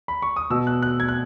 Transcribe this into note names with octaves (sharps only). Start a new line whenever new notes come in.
B5
C#6
D#6
B2 E6
F#6
F#6
G#6
F#6